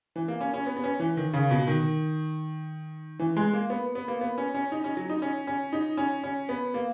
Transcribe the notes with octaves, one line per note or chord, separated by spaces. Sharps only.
E3
A#3
C#4
C#4
B3
B3
C#4
E3
D#3
C#3
B2
D#3
E3
G#3
A#3
B3
B3
A#3
B3
C#4
C#4
D#4
C#4
F#3
D#4
C#4
C#4
D#4
C#4
C#4
B3
A#3